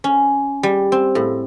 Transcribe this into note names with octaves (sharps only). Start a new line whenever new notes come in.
C#4
G3
C4
A2